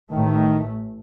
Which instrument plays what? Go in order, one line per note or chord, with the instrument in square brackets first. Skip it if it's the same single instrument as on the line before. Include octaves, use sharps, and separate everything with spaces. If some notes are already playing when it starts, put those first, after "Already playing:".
[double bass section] A1 A2 A3 [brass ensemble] D#3